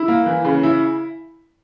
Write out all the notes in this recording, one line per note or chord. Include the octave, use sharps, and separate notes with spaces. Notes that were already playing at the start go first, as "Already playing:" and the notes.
Already playing: E4
A#3
E3
C#3
E4